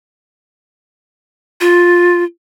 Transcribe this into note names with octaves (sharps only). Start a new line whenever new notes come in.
F4